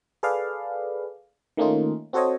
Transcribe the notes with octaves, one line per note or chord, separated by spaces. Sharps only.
G#4 A4 B4 D5 F5
D#3 A3 A#3 C#4 D#4 F4
C4 F#4 A4 C5 C#5 D#5